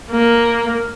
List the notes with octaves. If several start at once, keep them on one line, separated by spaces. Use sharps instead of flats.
A#3